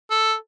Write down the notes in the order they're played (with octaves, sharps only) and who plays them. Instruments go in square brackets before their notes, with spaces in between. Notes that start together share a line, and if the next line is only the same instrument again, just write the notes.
[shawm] A4